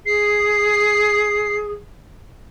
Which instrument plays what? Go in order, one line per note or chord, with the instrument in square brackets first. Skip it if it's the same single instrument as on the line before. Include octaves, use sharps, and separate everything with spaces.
[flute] G#4 [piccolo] C7